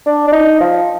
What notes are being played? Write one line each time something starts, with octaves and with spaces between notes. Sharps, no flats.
D4
D4
D#4
F3